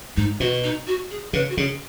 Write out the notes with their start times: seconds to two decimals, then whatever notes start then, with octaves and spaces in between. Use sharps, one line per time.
0.17 G#2 D#4
0.40 B2 F#4
0.64 D#4
0.87 F#4
1.11 G#4
1.33 C#3 B4
1.50 F#4
1.57 C#3 G#4